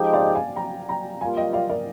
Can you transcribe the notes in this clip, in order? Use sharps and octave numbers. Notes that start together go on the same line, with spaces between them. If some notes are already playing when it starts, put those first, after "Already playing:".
Already playing: F3 G#3 D#4 G4
D5 F5
F5 G#5
G5 A#5
G5 A#5
G3 A#3 F4 F5 G#5
D#5 G5
D5 F5
A#4 D5